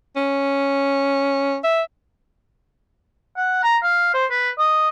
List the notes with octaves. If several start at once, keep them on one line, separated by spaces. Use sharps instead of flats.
C#4
E5
F#5
A#5
F5
C5
B4
D#5